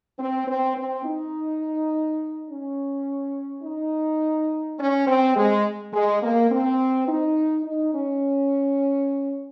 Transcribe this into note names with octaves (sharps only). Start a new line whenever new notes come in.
C4
C4
C4
D#4
C#4
D#4
C#4
C4
G#3
G#3
A#3
C4
D#4
D#4
C#4